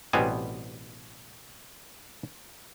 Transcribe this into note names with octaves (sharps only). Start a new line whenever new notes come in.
A1 B2 G3 B3 C4 G#5